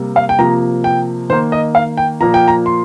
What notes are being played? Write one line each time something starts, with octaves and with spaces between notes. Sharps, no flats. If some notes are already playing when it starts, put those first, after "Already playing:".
Already playing: C3 G3 A#3
F5
G5
C3 F3 A#3 A#5
G5
D#3 A#3 C5
D#5
F5
G5
A#2 F3 A#3 A#5
G5
A#5
C6